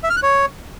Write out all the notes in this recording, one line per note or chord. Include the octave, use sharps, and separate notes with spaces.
E5
F6
F#6
C#5